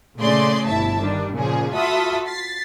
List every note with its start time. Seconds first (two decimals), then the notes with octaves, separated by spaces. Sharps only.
0.18 A#2 C#3 A3 G#4 D5 C6
0.67 G1 B2 E4 E5 A5
1.00 D#3 G3 D4
1.35 A#2 C#3 F3 G#4
1.74 F4 F#4 A4 E5 B5 D#6
2.26 A6 B6 C7